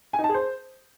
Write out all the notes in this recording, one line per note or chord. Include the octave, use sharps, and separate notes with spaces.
G#5
D#4
A5
G#4
C5